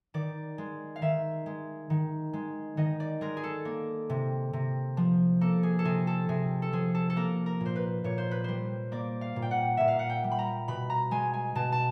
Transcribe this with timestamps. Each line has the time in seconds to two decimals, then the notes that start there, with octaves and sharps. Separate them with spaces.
0.14 D#3 D5
0.58 G#3
0.96 F5
1.02 D#3 E5
1.46 G#3
1.90 D#3
2.33 G#3
2.77 D#3 D#5
3.00 D5
3.21 G#3 A#4
3.37 G#4
3.43 A4
3.65 A#3
4.10 C3
4.53 C3
4.97 F3
5.41 A#3 A4
5.63 G#4
5.79 A4
5.85 C3 G#4
6.07 A4
6.29 C3 G#4
6.62 A4
6.73 F3 G#4
6.95 A4
7.10 A4
7.16 A#3 A#4
7.46 A#4
7.61 A#2
7.66 C5
7.76 B4
8.04 A#2 C#5
8.18 C5
8.31 B4
8.44 G3 C5
8.92 A#3 D5
9.21 F5
9.36 A#2
9.42 G5
9.51 F#5
9.77 A#2 E5
9.88 F5
9.99 F#5
10.09 G5
10.24 G3
10.31 B5
10.39 A#5
10.68 B2 B5
10.90 A#5
11.11 G#3 G#5
11.34 G#5
11.55 B2 A5
11.72 A5